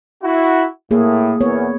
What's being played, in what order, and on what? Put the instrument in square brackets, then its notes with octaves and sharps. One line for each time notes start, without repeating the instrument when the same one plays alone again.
[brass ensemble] E4 F#4
[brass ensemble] A2 [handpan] A#3 G#4
[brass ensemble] E2 [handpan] B3 C#5